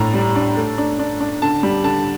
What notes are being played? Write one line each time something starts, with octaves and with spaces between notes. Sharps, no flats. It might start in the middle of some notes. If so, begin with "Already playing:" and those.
Already playing: A2 D4 A#5
G3
D4
A3
D4
D4
D4
D3 A5
G3
D3 A5